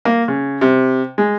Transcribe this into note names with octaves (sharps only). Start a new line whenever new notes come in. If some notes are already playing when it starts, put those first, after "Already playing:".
A#3
C#3
C3
G#3